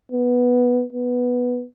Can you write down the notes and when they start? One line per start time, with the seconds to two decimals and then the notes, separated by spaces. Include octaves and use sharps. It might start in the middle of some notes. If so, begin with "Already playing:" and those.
0.12 B3
0.93 B3